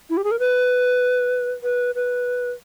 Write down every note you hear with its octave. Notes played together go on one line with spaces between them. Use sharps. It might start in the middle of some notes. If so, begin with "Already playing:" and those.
E4
G4
G#4
A#4
B4
B4
B4